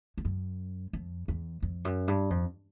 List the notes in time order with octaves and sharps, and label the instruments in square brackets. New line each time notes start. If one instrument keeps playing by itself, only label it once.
[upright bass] F2
F#2
F2
E2
F2
F#2
G2
F2